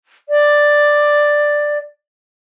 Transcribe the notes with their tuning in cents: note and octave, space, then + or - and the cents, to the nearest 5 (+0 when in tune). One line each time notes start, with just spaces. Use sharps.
D5 +5